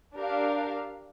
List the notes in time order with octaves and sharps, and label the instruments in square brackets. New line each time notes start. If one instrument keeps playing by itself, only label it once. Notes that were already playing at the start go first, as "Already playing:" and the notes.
[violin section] D4 G4 A#4 F5